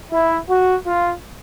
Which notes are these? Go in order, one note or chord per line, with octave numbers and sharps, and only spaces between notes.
E4
F#4
F4